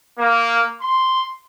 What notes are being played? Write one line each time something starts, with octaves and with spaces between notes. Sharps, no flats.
A#3
C6